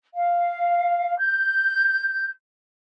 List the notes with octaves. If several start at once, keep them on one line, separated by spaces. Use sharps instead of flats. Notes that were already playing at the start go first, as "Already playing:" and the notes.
F5
G6